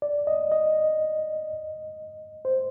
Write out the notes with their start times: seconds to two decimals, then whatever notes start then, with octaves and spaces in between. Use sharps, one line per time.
0.02 D5
0.27 D#5
0.52 D#5
2.45 C5